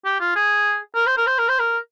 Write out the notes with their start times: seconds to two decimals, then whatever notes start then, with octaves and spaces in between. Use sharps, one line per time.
0.05 G4
0.20 F4
0.36 G#4
0.95 A#4
1.07 C5
1.17 A#4
1.27 C5
1.38 A#4
1.49 C5
1.59 A#4